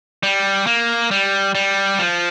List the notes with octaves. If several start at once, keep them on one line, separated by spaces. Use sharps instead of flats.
G3
A#3
G3
G3
F3